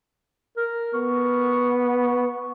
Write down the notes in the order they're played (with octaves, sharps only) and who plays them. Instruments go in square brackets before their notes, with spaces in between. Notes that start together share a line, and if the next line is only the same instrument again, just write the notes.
[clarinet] A#4
[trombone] B3 [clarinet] C#6